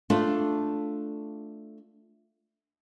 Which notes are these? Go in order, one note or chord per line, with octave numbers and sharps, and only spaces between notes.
A3 D4 F4